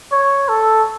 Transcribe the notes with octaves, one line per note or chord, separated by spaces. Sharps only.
C#5
A4